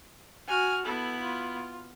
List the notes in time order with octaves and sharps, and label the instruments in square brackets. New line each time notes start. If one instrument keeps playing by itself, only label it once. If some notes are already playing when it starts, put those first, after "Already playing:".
[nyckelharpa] F#4 [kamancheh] G#5 F6
[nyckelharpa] B3 E4 [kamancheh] A4
[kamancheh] F4